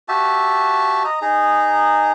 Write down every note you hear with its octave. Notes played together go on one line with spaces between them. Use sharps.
F#4 G4 E5 A5
D#5 A#5
D#4 G#4 A#5